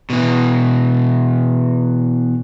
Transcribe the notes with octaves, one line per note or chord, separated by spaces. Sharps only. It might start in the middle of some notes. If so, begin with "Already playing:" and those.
B2 E3